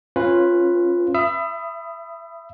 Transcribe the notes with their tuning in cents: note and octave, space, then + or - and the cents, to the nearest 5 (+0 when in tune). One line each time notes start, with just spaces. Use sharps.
C#4 -25 F4 +0 B4 +5
E5 +30 B5 +5 D#6 +0